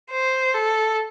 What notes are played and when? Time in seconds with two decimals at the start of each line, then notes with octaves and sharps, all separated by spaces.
0.11 C5
0.54 A4